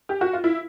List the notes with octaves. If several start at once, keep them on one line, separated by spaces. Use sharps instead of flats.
G4
F#4
F4
E4